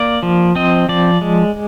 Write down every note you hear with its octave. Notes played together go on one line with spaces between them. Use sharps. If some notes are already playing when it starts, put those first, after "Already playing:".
Already playing: A#3 D5
F3
C4 D#5
F3 D5
G#3